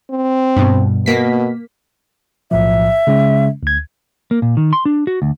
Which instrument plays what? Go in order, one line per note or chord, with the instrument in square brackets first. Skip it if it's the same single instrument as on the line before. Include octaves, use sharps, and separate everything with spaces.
[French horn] C4
[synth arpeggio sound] G2 B2
[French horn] B2 [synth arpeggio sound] A#3 B6
[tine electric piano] B1 A2 F3 [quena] E5
[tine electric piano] C#3 G#3 C#4
D2 G#6
[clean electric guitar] A#3
A#2
D#3
C6
D4
F#4
D2